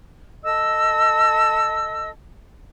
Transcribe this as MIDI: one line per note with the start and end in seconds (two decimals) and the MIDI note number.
0.43 2.09 69
0.43 2.09 75
0.43 2.09 88